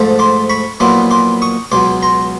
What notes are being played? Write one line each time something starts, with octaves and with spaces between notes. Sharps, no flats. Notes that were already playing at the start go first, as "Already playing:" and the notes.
Already playing: G#2 F3 A3
C6 D6
B5 C#6
A#1 A#2 F#3 B3 E4 C6 D6
C6 D6
C#6 D#6
C#2 B2 F#3 C6 D6
A#5 C6